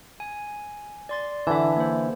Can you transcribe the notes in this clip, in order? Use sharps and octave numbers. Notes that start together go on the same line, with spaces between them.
G#5
D5 C6 A6
D3 E3 E5 A5
A#3 C5